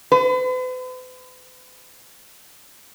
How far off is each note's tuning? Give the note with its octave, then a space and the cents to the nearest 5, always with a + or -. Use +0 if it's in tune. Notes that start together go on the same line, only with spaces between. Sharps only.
B4 +45